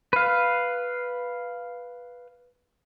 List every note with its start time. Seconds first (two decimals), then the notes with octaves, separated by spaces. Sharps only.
0.13 B4 F5